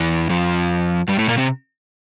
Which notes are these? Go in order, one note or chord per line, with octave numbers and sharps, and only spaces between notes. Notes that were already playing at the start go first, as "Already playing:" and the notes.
Already playing: E2 E3
F2 F3
G2 G3
A2 A3
A#2 A#3
C3 C4